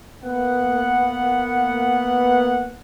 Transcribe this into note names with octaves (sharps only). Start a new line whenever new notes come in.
A#3 B3 F#5